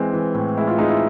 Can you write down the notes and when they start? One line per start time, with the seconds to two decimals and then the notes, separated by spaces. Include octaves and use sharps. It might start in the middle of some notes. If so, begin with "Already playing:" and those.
Already playing: E3 G#3 C4
0.13 E3
0.34 A2
0.57 G#3 E4
0.68 F4
0.78 G#3 D#4
0.90 E4